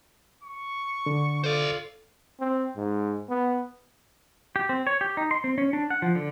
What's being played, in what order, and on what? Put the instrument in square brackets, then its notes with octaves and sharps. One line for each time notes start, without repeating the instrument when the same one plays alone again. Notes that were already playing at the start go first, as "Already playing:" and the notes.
[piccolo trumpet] C#6
[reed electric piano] D3
[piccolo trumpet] F4 [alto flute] A4 [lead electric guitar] C5 D5
[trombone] C4
G#2
B3
[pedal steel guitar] G4
C4
C#5
G4
D#4
C6
C4
C#4
D4
F#5
F3
D3